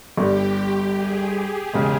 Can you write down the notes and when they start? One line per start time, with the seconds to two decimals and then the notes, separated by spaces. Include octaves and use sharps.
0.17 G1 G2 G3 G4
0.96 G#4
1.35 G#4
1.73 E1 C#3 G#3